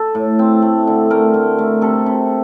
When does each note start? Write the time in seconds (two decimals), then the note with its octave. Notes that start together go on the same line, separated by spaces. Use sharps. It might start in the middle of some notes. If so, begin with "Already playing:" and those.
Already playing: A4
0.15 A2
0.39 C4
0.62 A3
0.87 D3
1.11 A3 A#4
1.34 A3
1.59 A3
1.81 C3 A4
2.06 C3